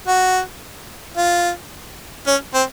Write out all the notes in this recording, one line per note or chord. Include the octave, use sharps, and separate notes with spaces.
F#4
F4
C#4
C4